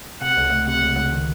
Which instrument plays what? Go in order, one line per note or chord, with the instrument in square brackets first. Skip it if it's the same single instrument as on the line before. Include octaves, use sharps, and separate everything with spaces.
[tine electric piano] C3 [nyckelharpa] F#5
[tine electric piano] C#2
A3
[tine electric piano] C3 [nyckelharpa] F#5
[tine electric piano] C#2
C#2
D#3